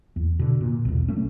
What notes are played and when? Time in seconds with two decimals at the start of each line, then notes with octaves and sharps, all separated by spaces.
0.16 E2
0.39 B2 D3
0.61 A#2
0.85 B1 E2
1.08 B1 A3 C#4